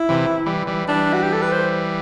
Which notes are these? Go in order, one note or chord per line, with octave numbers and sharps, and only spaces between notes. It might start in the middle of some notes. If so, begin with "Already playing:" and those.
Already playing: E4
C3 E3
E3 G3
E3 G3
E3 G3 D4
F#4
G4
A4
B4
C5